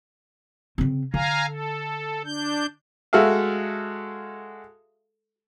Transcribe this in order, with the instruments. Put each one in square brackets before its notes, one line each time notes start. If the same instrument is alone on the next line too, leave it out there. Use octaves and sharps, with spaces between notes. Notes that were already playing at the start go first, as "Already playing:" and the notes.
[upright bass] C#3 C4
[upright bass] D3 [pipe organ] F5 G#5 A#5
[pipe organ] A4
D4 G6
[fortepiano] G#3 F#4 A4 E5 F5